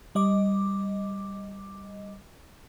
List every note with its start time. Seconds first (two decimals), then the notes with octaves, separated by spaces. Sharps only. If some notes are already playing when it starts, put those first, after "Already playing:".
0.15 G3 D#5 D6